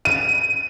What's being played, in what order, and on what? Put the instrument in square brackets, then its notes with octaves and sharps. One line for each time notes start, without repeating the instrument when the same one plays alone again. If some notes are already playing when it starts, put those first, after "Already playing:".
[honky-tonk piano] D#7